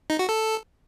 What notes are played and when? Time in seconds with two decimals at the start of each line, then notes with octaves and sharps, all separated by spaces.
0.10 D#4
0.19 F#4
0.29 A4